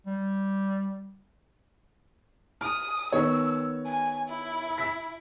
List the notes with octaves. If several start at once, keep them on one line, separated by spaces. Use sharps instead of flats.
G3
D#6 F6
D#3 B3 C#5 E6
G#5
E4
E6 B6